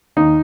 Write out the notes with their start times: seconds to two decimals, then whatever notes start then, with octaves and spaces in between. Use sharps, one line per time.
0.17 D#2 D#3 D#4